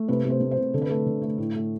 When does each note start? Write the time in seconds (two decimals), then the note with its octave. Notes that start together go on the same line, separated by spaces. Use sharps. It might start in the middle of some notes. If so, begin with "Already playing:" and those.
Already playing: A3
0.08 C3 B4
0.25 C3
0.30 C5
0.40 C3
0.51 C5
0.58 C3
0.74 D3 A4
0.82 B4
0.90 A3 A4
1.06 D3
1.22 A3
1.38 A2
1.55 A3